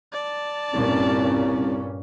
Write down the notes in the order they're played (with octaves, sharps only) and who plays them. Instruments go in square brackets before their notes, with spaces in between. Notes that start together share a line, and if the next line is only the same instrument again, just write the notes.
[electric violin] D5 A5
[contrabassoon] C2 [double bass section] G2 A#2 C#4